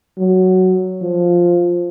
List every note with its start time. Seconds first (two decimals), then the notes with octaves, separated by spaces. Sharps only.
0.18 F#3
1.02 F3